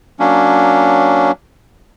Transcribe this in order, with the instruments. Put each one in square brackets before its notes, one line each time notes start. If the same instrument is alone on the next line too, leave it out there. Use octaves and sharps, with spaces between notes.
[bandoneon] F#3 A#3 C#4 D4